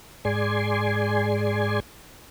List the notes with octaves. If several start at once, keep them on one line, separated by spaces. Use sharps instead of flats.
G#2 G#4 D5 G#5 C6